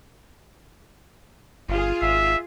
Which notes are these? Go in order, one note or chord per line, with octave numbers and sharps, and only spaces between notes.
G1 F4 G#4
G#1 E5